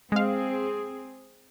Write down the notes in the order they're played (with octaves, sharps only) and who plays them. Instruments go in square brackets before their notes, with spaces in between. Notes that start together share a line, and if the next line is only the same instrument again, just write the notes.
[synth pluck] G#3 F5 [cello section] C4 G#4